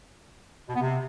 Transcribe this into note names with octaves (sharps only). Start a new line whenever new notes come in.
B2
B3
C3